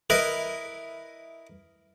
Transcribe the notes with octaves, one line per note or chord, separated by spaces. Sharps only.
E4 A#4 B4 D#5